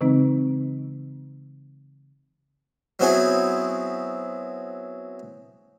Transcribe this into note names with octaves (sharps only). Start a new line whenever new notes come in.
C#3 E3 G#3 C4 D#4
F#3 B3 C4 E4 G#4